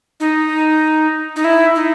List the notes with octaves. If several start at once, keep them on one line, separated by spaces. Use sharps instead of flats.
D#4
D#4
E4
D#4